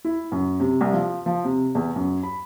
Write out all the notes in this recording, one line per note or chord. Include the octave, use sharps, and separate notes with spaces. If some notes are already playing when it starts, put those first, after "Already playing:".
E4
F#2
C3
C2
F3
F3
C3
E2
F#2
B5